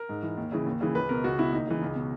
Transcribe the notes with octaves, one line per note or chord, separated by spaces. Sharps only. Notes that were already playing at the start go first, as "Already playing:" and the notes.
Already playing: A#4
G#2
E3
D#2
C#3 E3
D#2
C#3 E3
C#2 B4
B2 A#4
C#2 F#4
B2 E4
D#2 D#4
C#3 E3
C#2
B2